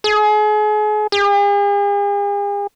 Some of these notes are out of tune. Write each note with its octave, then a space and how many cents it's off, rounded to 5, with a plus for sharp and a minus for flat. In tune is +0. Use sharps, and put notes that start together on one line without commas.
G#4 +35
G#4 -45